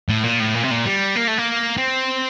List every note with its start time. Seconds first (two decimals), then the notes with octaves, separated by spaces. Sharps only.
0.09 A2
0.23 A#2
0.40 A2
0.54 A#2
0.63 C3
0.71 A#2
0.85 G3
1.15 A#3
1.27 A3
1.38 A#3
1.77 C4